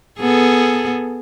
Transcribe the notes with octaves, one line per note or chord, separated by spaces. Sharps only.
B3 G#4 A4